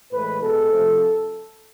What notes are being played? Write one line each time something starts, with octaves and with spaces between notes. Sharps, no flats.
A2 E3 G#3 B4
B2 G#3 B3 A4
C3 F3 A3 C4